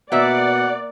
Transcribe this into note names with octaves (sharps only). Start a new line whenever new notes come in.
B2 A#3 D5 E5 F#5